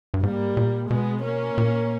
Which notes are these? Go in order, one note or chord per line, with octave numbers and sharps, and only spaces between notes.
G2
G#2 G3 A#3
A#2
B2 G#3 B3
A#3 C#4
A#2